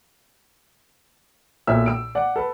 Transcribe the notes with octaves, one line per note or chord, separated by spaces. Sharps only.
B1 A#2 E5 E6
E6 D7
D5 F#5
A4 B4